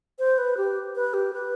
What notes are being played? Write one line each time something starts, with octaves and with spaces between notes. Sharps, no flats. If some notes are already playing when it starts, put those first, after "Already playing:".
C5
B4
G4
B4
G4
B4